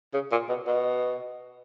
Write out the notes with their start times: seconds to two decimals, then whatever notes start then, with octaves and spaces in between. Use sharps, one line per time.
0.14 C#3
0.32 A#2
0.49 B2
0.67 B2